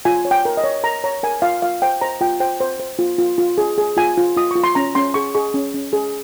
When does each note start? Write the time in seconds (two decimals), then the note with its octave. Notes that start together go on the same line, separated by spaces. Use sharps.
0.05 F4 G#5
0.25 C#5
0.31 G5
0.45 A#4
0.57 D#5
0.64 C#5
0.84 A#4 A#5
1.04 C#5 A#5
1.23 A#4 G#5
1.42 F4 F5
1.62 F4 F5
1.82 C5 G5
2.01 C5 A#5
2.21 F4 G5
2.40 C5 G5
2.60 C5
2.80 C5
2.99 F4
3.18 F4
3.38 F4
3.58 G#4
3.78 G#4
3.97 F4 G#5
4.17 F4
4.37 F4 D#6
4.51 F4 C#6
4.64 C6
4.75 C#4 A#5
4.95 C#4 C6
5.14 G#4 C#6
5.35 G#4 C#6
5.54 C#4
5.74 C#4
5.93 G#4